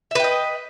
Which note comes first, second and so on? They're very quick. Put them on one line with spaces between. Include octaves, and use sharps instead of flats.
E5 B4 G5 D#5